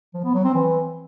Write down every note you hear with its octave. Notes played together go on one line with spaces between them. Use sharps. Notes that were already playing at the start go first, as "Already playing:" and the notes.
F3
B3
F#3
C4
E3